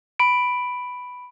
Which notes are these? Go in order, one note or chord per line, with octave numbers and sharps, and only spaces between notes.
B5 D7